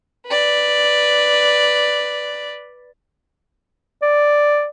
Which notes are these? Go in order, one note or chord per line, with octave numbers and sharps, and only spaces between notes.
B4 D5
D5